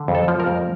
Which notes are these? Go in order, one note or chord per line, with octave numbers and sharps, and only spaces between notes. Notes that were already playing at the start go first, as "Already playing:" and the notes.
Already playing: D3
F2
A4
F3
A#4
F2